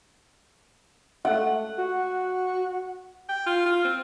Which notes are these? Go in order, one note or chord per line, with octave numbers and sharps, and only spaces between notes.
A3 F#5
F#4
G5
F4
F4
C4